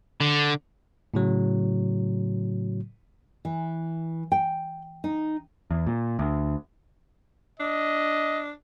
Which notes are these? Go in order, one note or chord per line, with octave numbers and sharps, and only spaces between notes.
D3
A2 C#3 F#3
E3
G5
D#4
E2
A#2
D2
D4 D#5